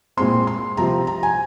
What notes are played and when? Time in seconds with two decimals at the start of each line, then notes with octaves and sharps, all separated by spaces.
0.17 A#2 G#3 C4 C6
0.47 C6
0.77 C3 F3 C4 A#5
1.07 A#5
1.23 G#5